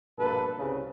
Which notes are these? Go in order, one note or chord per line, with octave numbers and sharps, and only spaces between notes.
A#1 G2 B2 A#3 A4 B4
C2 C#3